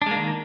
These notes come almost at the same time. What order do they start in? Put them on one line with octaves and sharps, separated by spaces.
D4 G#3 A#3 D#3